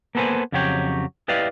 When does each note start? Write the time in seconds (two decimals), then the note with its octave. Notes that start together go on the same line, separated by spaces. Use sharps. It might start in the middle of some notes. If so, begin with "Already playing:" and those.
0.15 A#3 B3 A4 B4 C5 G#5
0.52 F2 C#3 F#3 G4 C#5 G5
1.28 E4 G4 B4 D5 D#5 F5